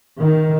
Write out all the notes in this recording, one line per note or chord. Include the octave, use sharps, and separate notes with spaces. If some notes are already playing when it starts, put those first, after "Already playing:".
D#3